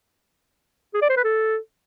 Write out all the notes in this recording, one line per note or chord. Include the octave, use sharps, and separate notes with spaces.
G#4
D5
C5
B4
A4